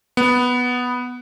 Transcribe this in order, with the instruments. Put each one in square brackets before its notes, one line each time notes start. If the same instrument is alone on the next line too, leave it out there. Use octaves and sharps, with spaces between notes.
[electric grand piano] B3